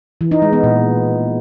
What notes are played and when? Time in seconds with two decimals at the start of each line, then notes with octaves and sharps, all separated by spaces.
0.21 E3
0.31 D#4
0.42 G#3
0.53 B3
0.63 A#2